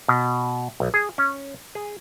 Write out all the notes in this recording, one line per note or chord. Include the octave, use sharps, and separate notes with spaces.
B2
B1
G#4
C#4
G#4